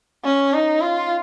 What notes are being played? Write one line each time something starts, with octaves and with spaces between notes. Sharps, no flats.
C#4
D#4
F4